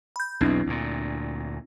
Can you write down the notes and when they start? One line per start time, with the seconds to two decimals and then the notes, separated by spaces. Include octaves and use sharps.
0.16 B5 G6
0.41 B1 E2 B2 C4 D4 E4
0.66 D2 A#2